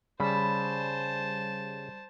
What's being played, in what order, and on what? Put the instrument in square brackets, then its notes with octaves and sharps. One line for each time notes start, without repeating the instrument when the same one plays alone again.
[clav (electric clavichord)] C#3 [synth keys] G3 [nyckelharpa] C5 A5 [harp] B5